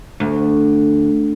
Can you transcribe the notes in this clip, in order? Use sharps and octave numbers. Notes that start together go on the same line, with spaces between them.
D2